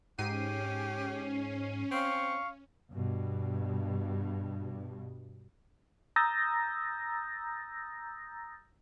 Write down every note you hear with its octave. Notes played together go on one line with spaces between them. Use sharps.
G#2 C#4 G4 C7 D#7
C4 F5 C#6
G2 B2
A#5 D#6 E6 G6 A6 A#6